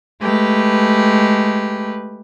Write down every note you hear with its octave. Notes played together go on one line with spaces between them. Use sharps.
G#3 A3 G4 B4